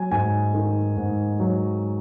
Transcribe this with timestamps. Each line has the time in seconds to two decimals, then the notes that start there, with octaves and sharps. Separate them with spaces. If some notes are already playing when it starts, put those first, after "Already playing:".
Already playing: F#3 G#5
0.11 G#2 G#5
0.54 D#3
0.97 G#2
1.40 F#3